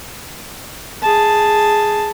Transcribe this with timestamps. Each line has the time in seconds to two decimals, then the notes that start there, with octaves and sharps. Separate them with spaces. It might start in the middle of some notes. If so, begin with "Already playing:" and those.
1.03 G#4 A5